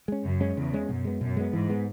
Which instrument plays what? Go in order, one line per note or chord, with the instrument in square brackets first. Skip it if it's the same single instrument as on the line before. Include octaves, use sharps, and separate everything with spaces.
[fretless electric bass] G#3 C#4
[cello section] F#2 [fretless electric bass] C#3
[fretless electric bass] G#3 C#4
[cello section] E2 [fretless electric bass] C#3
[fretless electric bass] G#3 C#4
[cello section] F#2 [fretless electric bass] B2
[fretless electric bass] G#3 B3
[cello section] F#2 [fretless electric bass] B2
[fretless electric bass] G#3 B3
[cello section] G#2 [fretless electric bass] E3
[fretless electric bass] G#3 B3